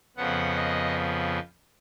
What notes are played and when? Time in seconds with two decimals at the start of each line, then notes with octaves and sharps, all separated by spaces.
0.17 F2 C#3 F3 B3 F#5
0.55 D#5